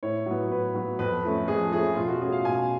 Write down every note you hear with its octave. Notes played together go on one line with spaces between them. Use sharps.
A2 C#5
F#3 B3
A2 B4
F#3 B3
F2 B4
F3 A3 C#4
F2 G#4
F3 A3 C#4 G#4
B2 F4
F#4
A3 C#4 G#4
F5
B2 G#5